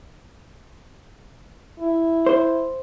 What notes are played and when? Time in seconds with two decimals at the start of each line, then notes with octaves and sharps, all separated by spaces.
1.80 E4
2.26 C5